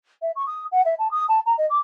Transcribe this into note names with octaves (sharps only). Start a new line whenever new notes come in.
E5
C#6
D#6
F#5
E5
A5
D#6
A5
A#5
D#5
D6